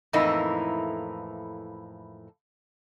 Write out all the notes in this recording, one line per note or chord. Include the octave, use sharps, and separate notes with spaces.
F2 A2 E3 A#3 D#4 E4